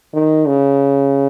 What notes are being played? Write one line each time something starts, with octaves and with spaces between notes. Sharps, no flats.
D#3
C#3